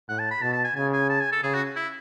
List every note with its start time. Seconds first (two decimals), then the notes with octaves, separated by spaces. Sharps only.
0.08 A2 F#5
0.19 A5
0.31 B5
0.42 B2 A5
0.53 A5
0.64 G#5
0.76 C#3 G#5
0.93 G#5
1.09 A5
1.20 G#5
1.32 A4
1.43 C#3 G#4
1.54 F#4
1.76 E4